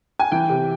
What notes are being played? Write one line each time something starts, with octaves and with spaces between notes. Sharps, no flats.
G#5
E3 G5
C3